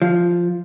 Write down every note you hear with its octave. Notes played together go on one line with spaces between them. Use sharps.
F3